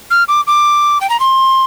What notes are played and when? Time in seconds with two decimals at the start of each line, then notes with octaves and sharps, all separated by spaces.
0.10 F6
0.28 D6
0.47 D6
1.01 G5
1.10 A#5
1.20 C6